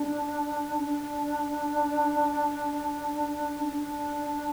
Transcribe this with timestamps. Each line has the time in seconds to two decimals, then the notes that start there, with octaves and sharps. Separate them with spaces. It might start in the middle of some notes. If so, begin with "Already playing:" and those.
Already playing: D4
0.79 D4
3.64 D4